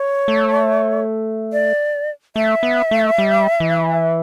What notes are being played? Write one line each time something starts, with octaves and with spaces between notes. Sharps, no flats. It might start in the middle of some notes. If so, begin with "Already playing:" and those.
Already playing: C#5
A3
D5
A3 E5
B3
A3
G3
E3